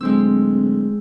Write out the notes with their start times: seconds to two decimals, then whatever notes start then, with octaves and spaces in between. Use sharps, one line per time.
0.01 D1 G#3 C4 E6